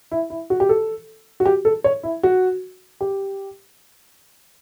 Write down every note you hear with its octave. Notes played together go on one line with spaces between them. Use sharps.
E4
E4
F#4
G4
A4
F#4
G4
A4
C#5
E4
F#4
G4